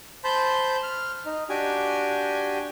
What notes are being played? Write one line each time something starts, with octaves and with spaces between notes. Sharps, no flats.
C5 A5 B5 C6 G6
F6
D#4
D4 F#4 G4 G5 G#5